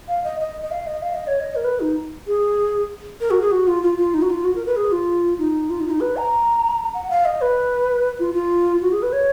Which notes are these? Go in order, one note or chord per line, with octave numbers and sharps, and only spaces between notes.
F5
D#5
D#5
D#5
F5
D#5
F5
D#5
C#5
D#5
A#4
B4
D#4
G#4
A#4
F#4
G#4
F#4
F4
F4
F4
D#4
F#4
F4
F#4
A#4
B4
G#4
F4
D#4
F4
D#4
F4
D#4
B4
A#5
F#5
F5
D#5
B4
F4
F4
F#4
G#4
B4
C#5